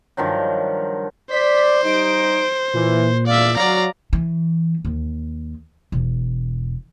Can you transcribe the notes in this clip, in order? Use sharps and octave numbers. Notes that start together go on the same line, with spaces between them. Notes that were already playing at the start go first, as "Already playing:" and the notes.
G2 D#3 F3 F#3
C5 D5 B6
G3 D#4 D7
A#2 E3
G#1 E2 D5 E5 F5
F#3 D5 F5 A#5
E3
D#2
E1